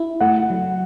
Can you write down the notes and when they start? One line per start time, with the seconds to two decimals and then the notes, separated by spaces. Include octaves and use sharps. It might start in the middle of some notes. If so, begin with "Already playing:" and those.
Already playing: E4
0.20 A3 F#5
0.50 F#3